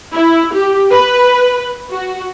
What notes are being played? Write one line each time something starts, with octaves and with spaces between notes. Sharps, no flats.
E4
G4
B4
F#4